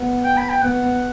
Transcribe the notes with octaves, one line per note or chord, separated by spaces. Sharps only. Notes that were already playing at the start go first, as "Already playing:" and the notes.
Already playing: B3
G5
B5
G5
B3 F#5